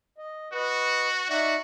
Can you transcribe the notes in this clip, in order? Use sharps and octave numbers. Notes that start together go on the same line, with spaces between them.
D#5
F#4 B4 D#5
D#4 F#4 D5 E5